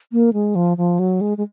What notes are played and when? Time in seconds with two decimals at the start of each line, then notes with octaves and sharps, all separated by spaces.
0.12 A#3
0.33 G#3
0.55 F3
0.77 F3
0.99 F#3
1.21 G#3
1.37 G#3